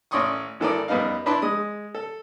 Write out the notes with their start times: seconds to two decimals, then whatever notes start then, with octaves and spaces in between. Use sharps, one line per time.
0.11 A1 C#4 D5 C6 C#6 D#6
0.60 G#1 E3 A4 A#4 D5
0.88 F#2 G3 B3 D#4 F5
1.26 D4 E4 B4 D5 A5 C6
1.42 G#3 D#6
1.95 A4